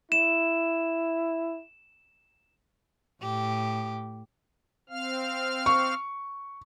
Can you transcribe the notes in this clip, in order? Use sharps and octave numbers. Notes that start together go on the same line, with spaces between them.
E4 E7
A2 G4
C4 F5 F6
C#6